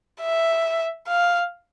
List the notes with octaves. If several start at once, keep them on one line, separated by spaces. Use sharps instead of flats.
E5
F5